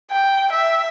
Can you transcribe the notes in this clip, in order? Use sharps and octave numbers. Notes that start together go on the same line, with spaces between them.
G5
E5